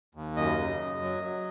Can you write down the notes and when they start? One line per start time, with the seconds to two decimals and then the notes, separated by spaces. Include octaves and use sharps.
0.15 D#2
0.36 F#2 D#5
0.58 C#3
0.80 F#2
1.02 F#3
1.23 F#3